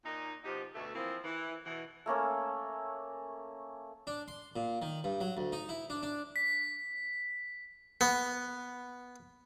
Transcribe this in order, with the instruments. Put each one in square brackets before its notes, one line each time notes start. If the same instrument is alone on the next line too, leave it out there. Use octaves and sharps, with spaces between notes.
[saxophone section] A#2 D#4
B2 F3 D#4 G4
D2 B2 A3
E3 F3 A#3 C4
E3
B2 E3
[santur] A3 A#3 C#4 A4
[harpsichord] D4
C6
A#2
D#3
G2
F#3
D2
D#4
E4
D4
D4
[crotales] B6
[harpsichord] B3